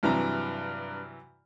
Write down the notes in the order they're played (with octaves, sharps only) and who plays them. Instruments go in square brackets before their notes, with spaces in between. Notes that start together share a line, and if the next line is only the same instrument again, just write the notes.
[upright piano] G2 A#5 [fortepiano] C3 E3 F#3